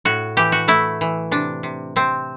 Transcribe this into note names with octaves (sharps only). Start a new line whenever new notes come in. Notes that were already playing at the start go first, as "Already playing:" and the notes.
A2 F#4
E3 G4
F#4
A3 E4
E3
C3 D4
C3
C3 C4